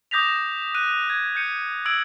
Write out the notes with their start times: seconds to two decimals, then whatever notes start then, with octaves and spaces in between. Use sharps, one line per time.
0.11 D6 D#6 G6 A#6 B6 F7
0.75 F#6 D#7
1.10 G#6
1.36 G6 C#7 D#7
1.86 E6 G#6 D7 F#7